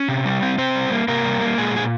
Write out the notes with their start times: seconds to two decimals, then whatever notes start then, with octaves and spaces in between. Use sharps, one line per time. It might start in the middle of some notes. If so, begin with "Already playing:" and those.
Already playing: C#4
0.09 C3
0.25 G3
0.42 C4
0.58 C3 C4 C5
0.75 G3
0.92 A#3
1.08 C3 A#3 A#4
1.25 G3
1.41 A#3
1.58 A#2 G#3 G#4
1.75 G#3 G#4